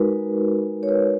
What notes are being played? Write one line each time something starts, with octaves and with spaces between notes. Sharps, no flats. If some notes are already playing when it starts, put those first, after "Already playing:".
Already playing: G#3 D#4 F#4 A#4 B4
C#5
B4